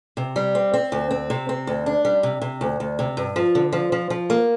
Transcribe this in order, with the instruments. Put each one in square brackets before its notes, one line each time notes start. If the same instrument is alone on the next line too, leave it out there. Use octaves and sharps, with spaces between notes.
[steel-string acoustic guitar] C3
G3
C4
C4
D2
C4
C3
C4
D2
D4
G3
C3
C3
D2
D2
C3
G2
F3
D3
F3
F3
F3
A#3